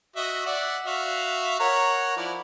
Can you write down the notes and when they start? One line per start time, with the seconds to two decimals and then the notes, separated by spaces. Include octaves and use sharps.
0.16 F#4 D#5 E5
0.46 D5 E5 F#5
0.87 F#4 E5 F5
1.60 A#4 C#5 F#5
2.17 F3 E4 D5